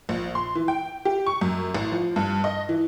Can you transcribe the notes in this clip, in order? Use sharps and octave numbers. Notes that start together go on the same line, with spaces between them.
A#1
C6
E3
G5
G4
C#6
F#2
A1
F3
G2
D#5
E3